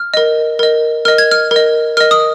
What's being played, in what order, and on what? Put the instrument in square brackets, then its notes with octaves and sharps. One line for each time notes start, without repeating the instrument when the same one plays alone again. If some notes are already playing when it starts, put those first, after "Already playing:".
Already playing: [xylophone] F6
A#4 D#5
A#4 D#5
A#4 D#5 F6
G#6
F6
A#4 D#5
A#4 D#5 F6
D#6